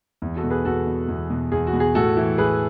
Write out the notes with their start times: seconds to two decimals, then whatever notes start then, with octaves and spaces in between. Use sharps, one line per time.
0.22 E2
0.36 F#4 A4
0.44 B2
0.50 G#4 B4
0.65 E2 F#4 A4
0.87 B2
1.08 E2
1.30 B2
1.52 E2 G#4
1.67 F#4
1.73 B2
1.80 G#4
1.95 A2 F#4 A4
2.17 E3
2.38 A2 G#4 B4